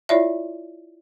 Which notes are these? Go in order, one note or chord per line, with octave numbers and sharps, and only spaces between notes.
E4 F4 C#5 D5 E5